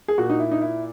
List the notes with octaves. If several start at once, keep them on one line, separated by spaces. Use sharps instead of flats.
G#4
A#2 F#4
D#4
E4
D#4
E4